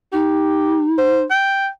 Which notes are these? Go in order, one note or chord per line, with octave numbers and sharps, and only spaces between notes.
D#4 G4
C5
G5